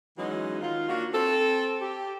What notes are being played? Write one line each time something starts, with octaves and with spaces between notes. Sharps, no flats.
E3 F#3 G#3 C#4 D#4
D#3 D#4 F4
A#3 D4 F4 F#4
C4 A4
G4